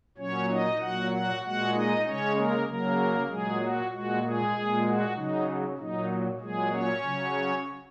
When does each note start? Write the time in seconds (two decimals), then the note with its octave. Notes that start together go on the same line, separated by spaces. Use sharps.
0.18 A#2 F#3 C#4 C#5
0.49 D#4 D#5
0.80 A#2 F#3 F#4 F#5
1.11 F#4 F#5
1.42 A#2 G#3 F#4 F#5
1.73 D#4 D#5
2.04 C#3 G#3 C#4 C#5
2.36 A#3 A#4
2.67 C#3 F#3 A#3 A#4
3.29 A#2 F#3 G#3 G#4
3.60 F#4
3.91 A#2 G#3 F#4
4.23 G#3 G#4
4.54 A#2 G#3
4.85 F#4
5.15 C#3 F#3 D#4
5.78 A#2 F#3 D#4
6.40 A#2 F#3 G#3 G#4
6.71 C#4 C#5
7.03 C#3 F#3